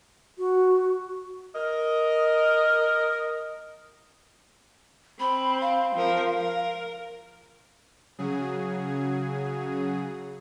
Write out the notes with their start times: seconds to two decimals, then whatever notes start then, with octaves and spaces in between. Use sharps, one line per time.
0.38 F#4
1.54 A#4 D#5
5.20 C4 B5
5.61 F5
5.95 F3 A#4
6.34 A#4
8.18 C#3 F#3 G#4